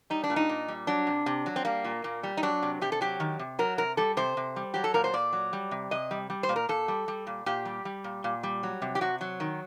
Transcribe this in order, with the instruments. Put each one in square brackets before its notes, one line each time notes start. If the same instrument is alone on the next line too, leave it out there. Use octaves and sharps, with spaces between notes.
[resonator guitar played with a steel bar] G3 D#4
D4
A#2
D#4
A#2
G3
F#3 D4
C3
C3
F#3
C4
G3 A#3
A#2
A#2
G3
D#4
F#3 D4
C3
C3 G4
A4
F#3 G4
D#3
C3
F#3 A#4
C3 A#4
G3 A4
C3 C5
C3
G3
F#3 G4
A4
A#2 A#4
C5
A#2 D5
F#3
G3
C3
C3 D#5
G3
G3
C5
A#2
A#4
A#2 A4
G3
G3
A#2
A#2 G4
G3
G3
A#2
A#2
G3
F#3
C3
G4
C3 F#4
F#3
D#3